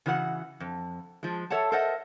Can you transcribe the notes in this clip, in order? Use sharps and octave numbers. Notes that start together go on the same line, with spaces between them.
C#3 E3 F#4 C5 F#5
F2
F3 G#3
A4 C#5 E5 F#5 A5
A4 A#4 C5 D#5 E5 F#5